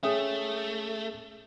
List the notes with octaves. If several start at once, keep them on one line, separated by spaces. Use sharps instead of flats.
A3 C#4 G#4 C#5 E5 D#6